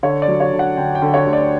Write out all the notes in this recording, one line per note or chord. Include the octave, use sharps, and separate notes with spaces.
D3 C#5
D5
F#3
C#5
D3
F#5
D3 G5
G5
D3
C#5
D2
D5